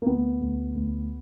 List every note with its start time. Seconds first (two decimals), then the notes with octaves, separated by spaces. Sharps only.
0.02 A#3
0.07 D2 B3
0.41 D2
0.75 D2